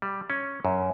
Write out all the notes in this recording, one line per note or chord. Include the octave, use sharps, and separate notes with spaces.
G3
C#4
F#2